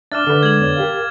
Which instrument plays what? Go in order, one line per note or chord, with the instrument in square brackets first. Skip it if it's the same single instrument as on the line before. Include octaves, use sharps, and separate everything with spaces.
[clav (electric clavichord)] D4 [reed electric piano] E5 F#6 [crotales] D6 F6 A6
[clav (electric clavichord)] D3 B4
[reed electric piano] G#3 [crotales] G#6 F#7
[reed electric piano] F2 B3 C#5
G4 A#4 F5